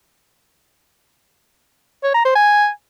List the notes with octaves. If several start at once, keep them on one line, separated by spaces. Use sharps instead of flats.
C#5
A#5
C5
G#5